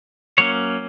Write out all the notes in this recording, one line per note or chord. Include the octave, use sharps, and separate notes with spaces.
F#3 A#3 C#4 C#5